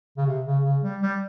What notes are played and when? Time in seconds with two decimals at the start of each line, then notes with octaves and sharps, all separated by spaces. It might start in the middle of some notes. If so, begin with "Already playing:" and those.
0.17 C#3
0.27 C3
0.46 C#3
0.64 C#3
0.83 G3
1.02 G3